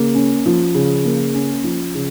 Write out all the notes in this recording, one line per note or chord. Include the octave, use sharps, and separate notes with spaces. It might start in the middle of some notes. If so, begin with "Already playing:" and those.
Already playing: C#3 A#3
C#4
F3
C#3
A#3
C#4
F3
C#3